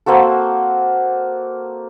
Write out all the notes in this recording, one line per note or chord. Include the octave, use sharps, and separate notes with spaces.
A#3 C4 F#4 A4